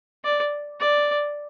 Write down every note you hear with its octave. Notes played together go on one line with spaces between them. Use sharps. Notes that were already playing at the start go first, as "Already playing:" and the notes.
D5
D5